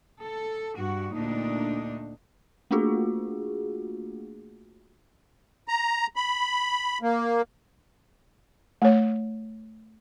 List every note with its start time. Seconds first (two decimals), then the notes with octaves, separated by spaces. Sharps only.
0.22 A4
0.78 G2 F#4
1.14 D2 A#2 D4 D#4
2.71 A3 A#3 D4 F4 F#4 G#4
5.68 A#5
6.16 B5
7.02 A#3
8.82 A3 C#5